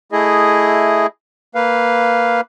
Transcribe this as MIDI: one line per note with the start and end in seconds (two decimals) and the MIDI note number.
0.12 1.07 57
0.12 1.07 64
0.12 1.07 68
0.12 1.07 75
1.55 2.41 58
1.55 2.41 71
1.55 2.41 77